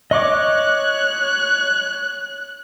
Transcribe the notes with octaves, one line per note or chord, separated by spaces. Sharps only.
C#5 D#5 C#6 D6 F#6